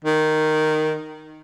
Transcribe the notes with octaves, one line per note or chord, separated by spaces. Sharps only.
D#3